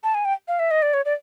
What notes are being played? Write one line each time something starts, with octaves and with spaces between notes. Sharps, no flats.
A5
G#5
G5
F5
E5
D#5
D5
C#5
D5